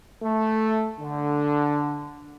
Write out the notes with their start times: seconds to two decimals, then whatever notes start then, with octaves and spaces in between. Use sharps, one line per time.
0.23 A3
1.00 D3